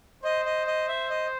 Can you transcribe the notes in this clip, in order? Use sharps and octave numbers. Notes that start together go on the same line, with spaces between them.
C5 D#5
D#5
D#5
E5
D#5